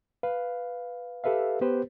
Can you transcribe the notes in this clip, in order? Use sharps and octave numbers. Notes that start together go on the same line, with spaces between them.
B4 F5
G4 A4 B4 E5 F5
B3 G4 B4 C5